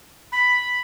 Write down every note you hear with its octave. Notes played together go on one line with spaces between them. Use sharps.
B5